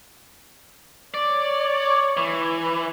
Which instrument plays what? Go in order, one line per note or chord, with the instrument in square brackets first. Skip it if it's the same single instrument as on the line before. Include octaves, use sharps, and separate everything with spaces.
[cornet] C#5 [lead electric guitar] D5
[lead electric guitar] E3